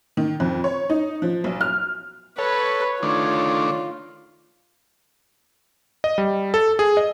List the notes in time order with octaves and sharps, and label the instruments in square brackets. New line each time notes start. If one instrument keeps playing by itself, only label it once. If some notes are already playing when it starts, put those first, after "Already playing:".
[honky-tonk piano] D#3
F2
C#5
D#4
F3
B1
F6
[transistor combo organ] A4 [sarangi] B4 [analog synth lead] C#5
[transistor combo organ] D#3 A3 D4 [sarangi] F4
[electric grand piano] D#5
G3
A4
G#4
D#5